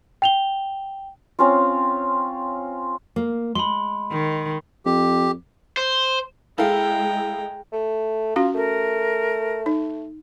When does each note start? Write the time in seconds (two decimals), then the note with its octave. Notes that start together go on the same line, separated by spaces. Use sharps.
0.22 G5 F7 G7
1.39 C4 C#4 F4
3.16 A#3
3.55 G#3 B5 C6
4.12 D#3
4.85 F2 G4
5.77 C5
6.58 G#3 E4 A4 F5 G5 A#5
7.73 A3
8.36 C#4 F4 F#4
8.55 A3 A#4
9.66 D#4